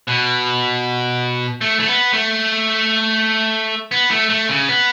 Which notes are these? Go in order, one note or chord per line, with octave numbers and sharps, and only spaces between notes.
B2
A3
A3
B3
A3
B3
A3
A3
C#3
B3